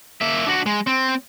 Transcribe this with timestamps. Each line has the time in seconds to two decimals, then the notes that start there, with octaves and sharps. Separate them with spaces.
0.21 A#3 E5
0.47 D4 F#4
0.66 G#3
0.87 C4